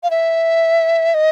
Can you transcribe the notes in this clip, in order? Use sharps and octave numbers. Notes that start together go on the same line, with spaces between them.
F5
E5
D#5